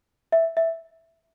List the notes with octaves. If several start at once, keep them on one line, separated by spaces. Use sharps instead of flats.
E5
E5